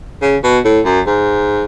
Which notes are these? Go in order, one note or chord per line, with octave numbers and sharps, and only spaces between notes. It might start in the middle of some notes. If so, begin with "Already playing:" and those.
C#3
B2
A2
F#2
G#2